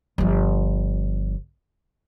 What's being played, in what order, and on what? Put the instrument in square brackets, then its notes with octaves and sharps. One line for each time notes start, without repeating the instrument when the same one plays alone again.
[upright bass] G1 F3